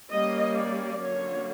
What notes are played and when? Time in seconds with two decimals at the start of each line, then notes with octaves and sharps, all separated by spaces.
0.12 G3 A#3 C#4 D#5
0.57 D5
1.01 D3 F#3 A#3 C#4 C#5